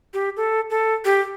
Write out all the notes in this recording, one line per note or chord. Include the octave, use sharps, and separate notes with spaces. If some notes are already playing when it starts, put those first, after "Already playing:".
G4
A4
A4
G4